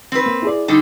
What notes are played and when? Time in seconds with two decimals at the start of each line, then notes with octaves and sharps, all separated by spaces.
0.12 C4 B4
0.26 A#3
0.42 E4 G#4 D5
0.68 D3 G3 D#4